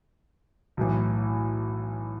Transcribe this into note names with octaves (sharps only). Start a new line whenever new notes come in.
B1 A2 E3